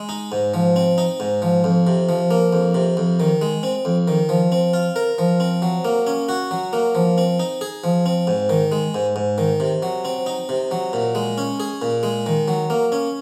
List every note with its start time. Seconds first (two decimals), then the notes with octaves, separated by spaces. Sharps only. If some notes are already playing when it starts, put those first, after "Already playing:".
Already playing: G#3
0.09 D#4
0.32 G#2
0.54 F3
0.76 C4
0.98 D#4
1.20 G#2
1.42 F3
1.64 F2
1.87 C3
2.09 F3
2.31 A#3
2.53 F2
2.74 C3
2.97 F2
3.20 D#3
3.42 G#3
3.63 C4
3.85 F2
4.08 D#3
4.29 F3
4.52 C4
4.74 F4
4.96 A#4
5.18 F3
5.40 C4
5.62 F#3
5.85 A#3
6.07 C#4
6.29 F#4
6.51 F#3
6.73 A#3
6.95 F3
7.18 C4
7.40 D#4
7.61 G#4
7.84 F3
8.06 C4
8.27 G#2
8.49 D#3
8.72 G#3
8.95 G#2
9.16 G#2
9.38 D#3
9.60 C3
9.83 F#3
10.05 C4
10.26 D#4
10.49 C3
10.71 F#3
10.93 A#2
11.15 G#3
11.38 C#4
11.60 G#4
11.82 A#2
12.03 G#3
12.26 D#3
12.48 F#3
12.70 A#3
12.92 C#4